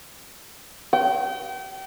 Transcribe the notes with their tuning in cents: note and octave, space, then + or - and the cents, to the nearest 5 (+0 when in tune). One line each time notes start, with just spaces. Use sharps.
G5 -35